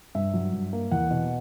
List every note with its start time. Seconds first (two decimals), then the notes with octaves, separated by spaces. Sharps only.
0.15 G2 E5
0.34 F#3
0.53 G2
0.73 A#3
0.91 E2 F#5
1.11 B2